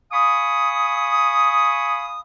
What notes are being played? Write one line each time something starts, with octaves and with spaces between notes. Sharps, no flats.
F5 G#5 B5 C#6 D#6